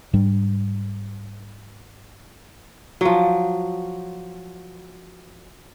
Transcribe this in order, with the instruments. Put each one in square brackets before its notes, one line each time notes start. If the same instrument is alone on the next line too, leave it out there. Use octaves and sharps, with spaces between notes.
[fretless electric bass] G#2 G3 D4
[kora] F3 F#3